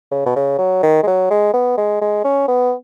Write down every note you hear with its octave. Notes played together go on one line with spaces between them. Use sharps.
C#3
B2
C#3
F#3
D#3
G#3
F#3
G#3
B3
G#3
G#3
C#4
B3